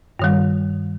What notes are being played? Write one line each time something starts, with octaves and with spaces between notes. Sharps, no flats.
G2 D#3 G3